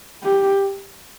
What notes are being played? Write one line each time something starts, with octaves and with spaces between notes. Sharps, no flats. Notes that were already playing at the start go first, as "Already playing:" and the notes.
G4